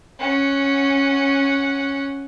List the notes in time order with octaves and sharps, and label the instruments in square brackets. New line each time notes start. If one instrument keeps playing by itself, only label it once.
[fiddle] C#4 F#5